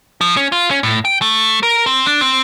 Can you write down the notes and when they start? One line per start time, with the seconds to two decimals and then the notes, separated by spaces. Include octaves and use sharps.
0.21 F3
0.37 C#4
0.52 F4
0.71 C#4
0.83 A2
1.05 G5
1.22 A3
1.63 A#4
1.86 C4
2.06 D4
2.21 C4